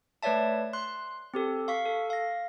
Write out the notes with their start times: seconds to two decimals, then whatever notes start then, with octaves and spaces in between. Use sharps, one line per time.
0.23 A3 B4 C#5 D5 E5 A5
0.73 C6 F#6
1.34 C4 G4 A4
1.68 F5 C#6 B6
1.86 A4
2.10 F5 A#6